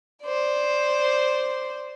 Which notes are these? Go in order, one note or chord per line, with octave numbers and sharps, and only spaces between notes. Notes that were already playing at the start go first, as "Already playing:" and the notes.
C5 D5